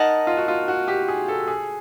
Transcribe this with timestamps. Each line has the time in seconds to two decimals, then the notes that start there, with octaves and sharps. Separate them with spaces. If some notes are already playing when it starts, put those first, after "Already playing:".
Already playing: D#4 A#4 D#5 F#5 A5
0.27 F4
0.37 F#4
0.48 F4
0.68 F#4
0.88 G4
1.08 G#4
1.28 A4
1.48 G#4